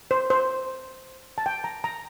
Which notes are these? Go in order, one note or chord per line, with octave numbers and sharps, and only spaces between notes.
C5
C5
A5
G5
A#5
A#5